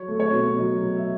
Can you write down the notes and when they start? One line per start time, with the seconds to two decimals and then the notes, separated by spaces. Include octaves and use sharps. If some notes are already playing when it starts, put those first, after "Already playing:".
Already playing: F#3 C#5
0.08 A3
0.20 C#5
0.32 B2
0.58 F#3 D#5
0.83 F#3
0.96 E5